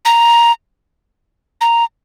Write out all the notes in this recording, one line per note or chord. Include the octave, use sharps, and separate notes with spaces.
A#5
A#5